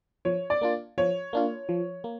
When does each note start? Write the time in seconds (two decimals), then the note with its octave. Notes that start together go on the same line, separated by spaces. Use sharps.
0.25 F3 C#5
0.50 D5
0.61 A#3 D4 F4
0.98 F3 C#5
1.33 A#3 D4 F4
1.69 F3
2.04 A#3